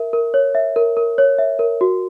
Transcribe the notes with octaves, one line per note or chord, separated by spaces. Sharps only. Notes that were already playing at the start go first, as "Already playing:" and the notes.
Already playing: A#4 E5
A#4
C#5
E5
A#4
A#4
C#5
E5
A#4
F#4